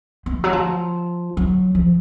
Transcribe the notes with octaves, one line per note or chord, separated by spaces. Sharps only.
B3
F3
F#3
F3
F#3
F3